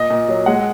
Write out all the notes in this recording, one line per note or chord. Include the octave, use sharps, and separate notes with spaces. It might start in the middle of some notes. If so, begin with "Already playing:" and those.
Already playing: A#2 D#5
A#2
F#3
G#3 F#5